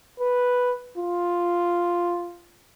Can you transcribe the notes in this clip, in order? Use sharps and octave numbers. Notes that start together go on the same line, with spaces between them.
B4
F4